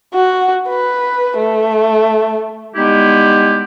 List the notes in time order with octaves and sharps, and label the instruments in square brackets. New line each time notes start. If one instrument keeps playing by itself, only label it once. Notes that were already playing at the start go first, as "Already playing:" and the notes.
[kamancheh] F#4
B4
A3
[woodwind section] G3 G#3 B3 D#4 E4 G4